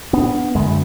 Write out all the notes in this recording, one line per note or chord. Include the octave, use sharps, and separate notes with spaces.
B3 D4
F#2 D3 G#3 B3